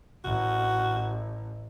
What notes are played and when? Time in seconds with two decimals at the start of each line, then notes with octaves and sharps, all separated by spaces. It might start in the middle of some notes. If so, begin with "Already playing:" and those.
0.24 A1 F#4